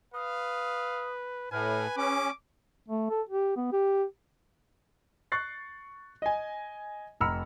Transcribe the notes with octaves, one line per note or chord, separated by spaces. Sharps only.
B4 F5 D#6
A2 B4 G#5 F6
C#4 G#4 D6
A3
A4
G4
B3
G4
C#6 F#6 A6 C7
D#5 G#5
F1 A#5 B5 E6 F6 C#7